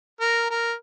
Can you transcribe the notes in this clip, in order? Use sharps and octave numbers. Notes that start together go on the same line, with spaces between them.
A#4
A#4